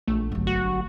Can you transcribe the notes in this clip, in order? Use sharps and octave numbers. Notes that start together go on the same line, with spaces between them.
A#1 A3
G1 F#3
F#4